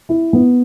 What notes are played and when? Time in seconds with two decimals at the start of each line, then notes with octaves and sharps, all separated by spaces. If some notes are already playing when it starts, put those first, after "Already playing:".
0.09 E4
0.33 B3